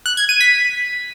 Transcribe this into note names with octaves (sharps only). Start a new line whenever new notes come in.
F#6
G#6
D#7
B6